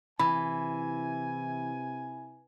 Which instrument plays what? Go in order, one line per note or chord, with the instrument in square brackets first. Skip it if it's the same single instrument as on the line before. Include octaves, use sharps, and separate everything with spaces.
[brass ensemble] C3 E4 G#5 [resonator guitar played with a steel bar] E3 [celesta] B5